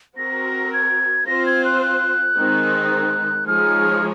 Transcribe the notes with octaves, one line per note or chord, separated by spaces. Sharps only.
C4 F#4 A#4 A#6
G#6
C4 F4 C5 A#6
G#6
F#6
F#6
D#3 G#3 C4 D#4
F3 G#3 D#4 G#4 C#5 F6